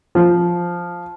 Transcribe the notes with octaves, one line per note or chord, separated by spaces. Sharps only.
F3